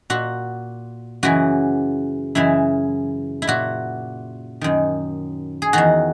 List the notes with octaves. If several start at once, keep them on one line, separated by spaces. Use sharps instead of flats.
A#2 F#4
F#2 C#3 E3 F#4
F#2 C#3 E3 E4
E4
A#2 F#4
F#2 D#3
G#4
E2 D#3 F#4